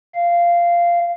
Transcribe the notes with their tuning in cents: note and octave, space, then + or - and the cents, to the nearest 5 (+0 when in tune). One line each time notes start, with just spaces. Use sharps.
F5 -10